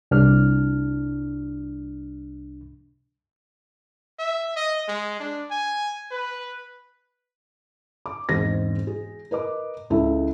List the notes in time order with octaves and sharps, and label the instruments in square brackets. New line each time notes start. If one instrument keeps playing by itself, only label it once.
[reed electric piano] C2 D4 F6
[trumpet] E5
D#5
G#3
D4
G#5
B4
[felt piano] D6
E1 G#2 C4 A#6
G#4
A#4 B4 D#5 D6
C#2 E4 A4 E5